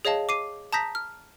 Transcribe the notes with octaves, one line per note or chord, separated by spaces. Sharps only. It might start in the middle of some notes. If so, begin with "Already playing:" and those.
G#4 C#5 D#5 F5 A5
D6 C7 D#7
A5 A#5 D#6 G6 A#6 B6
F6